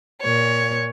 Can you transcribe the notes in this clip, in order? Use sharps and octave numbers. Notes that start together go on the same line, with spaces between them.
A#2 C#5